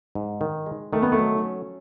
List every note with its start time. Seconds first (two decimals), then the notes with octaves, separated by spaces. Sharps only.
0.15 G#2
0.41 D#3
0.66 G#3
0.93 D#3 A3
1.02 B3
1.12 A3
1.19 F#3
1.45 C#4